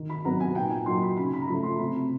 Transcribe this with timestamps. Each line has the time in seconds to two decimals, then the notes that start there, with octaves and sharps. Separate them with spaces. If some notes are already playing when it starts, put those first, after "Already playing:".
Already playing: D#3
0.09 B5
0.25 F#3 B3 D#4 A#5
0.40 G#5
0.55 A#2 G5
0.70 G#5
0.86 F#3 A#3 D#4 C6
1.02 B5
1.17 C#3 B5
1.33 B5
1.41 A#5
1.48 F3 A3 C#4 B5
1.63 C6
1.79 C3 B5